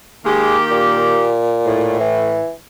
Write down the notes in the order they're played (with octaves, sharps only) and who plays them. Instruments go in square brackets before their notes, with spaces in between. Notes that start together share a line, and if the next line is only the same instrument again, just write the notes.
[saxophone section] D#3 A#3 G4 [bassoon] G#3
[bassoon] A#2
[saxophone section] A2
[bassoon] E3